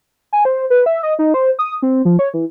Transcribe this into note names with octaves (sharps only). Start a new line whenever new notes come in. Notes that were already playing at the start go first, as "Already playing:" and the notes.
G#5
C5
B4
E5
D#5
D#4
C5
D#6
C4
F3
C#5
E3